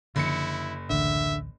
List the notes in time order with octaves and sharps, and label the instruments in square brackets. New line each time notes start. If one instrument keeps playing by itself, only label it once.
[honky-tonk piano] F#1 C#7 [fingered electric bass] D3 F3 [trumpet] E4
[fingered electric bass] A1 D2 [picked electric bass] D3 [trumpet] E5